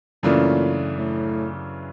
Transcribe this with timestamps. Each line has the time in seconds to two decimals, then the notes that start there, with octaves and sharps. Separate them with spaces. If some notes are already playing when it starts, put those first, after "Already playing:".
0.23 F#2 A#2 C#3 E3 A3 D4
0.97 A2